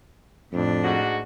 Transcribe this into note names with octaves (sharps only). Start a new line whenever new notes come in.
F2 A2 D4
G#2 F#4